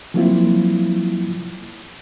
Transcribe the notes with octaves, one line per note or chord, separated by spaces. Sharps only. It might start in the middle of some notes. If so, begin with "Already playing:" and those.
F3 F#3 A#3 C4 E4 F4